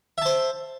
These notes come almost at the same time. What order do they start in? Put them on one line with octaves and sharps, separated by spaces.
E5 A5 C5